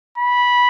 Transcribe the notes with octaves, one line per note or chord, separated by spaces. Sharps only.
B5